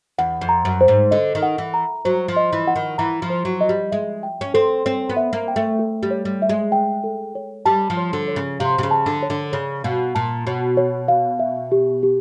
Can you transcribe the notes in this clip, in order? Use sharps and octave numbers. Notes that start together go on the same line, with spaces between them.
E2 F#5
F2
A#5
F#2
C5
G#2
D3 D#5
D#3
F#5
E3
A#5
F#3 C5
F3
D#5
E3
F#5
D#3
E3 A#5
F3
C5
F#3
D#5
G3
G#3 E5
G5
C#4
C4 A4
C4 C#5
B3
E5
A#3
G5
A3
A4
G3
C#5
G3
E5
G#3
G5
A4
C#5
G3 A5
F3
C#5
D3
C#5
C#3
C3 F5
C3
C#3
A5
D3
C#5
D3
C#3 C#5
B2 F5
A#2 A5
B2 C#5
C#5
F5
E5
G4
G4